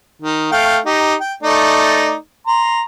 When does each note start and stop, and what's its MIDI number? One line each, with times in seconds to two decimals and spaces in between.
0.22 0.49 51
0.52 0.78 57
0.52 0.78 77
0.52 0.78 79
0.86 1.14 63
0.86 1.14 67
1.20 1.34 79
1.43 2.14 57
1.43 2.14 63
1.43 2.14 74
2.47 2.82 82
2.47 2.82 84